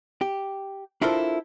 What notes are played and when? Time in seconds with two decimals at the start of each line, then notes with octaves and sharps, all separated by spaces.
0.21 G4
1.01 D4 E4 F4 A4 A#4 C5